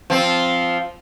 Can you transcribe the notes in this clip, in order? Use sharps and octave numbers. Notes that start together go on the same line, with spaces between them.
F3 C4